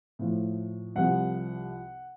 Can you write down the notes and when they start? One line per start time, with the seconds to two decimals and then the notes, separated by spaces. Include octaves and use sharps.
0.19 A2 F3
0.95 C2 C3 F3 F#5